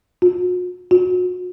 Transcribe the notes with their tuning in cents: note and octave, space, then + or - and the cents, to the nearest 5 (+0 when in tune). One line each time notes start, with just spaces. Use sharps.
F#4 -45
F#4 -35